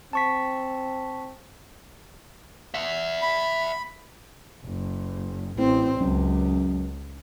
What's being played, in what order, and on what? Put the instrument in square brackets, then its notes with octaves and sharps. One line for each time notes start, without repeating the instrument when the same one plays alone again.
[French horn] C4 [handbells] A5 C#6 B6
[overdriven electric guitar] E5 F#5
[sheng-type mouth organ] B5
[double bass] F#1
[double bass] A1 C4 [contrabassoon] A2
[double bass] C#2 [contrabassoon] F#2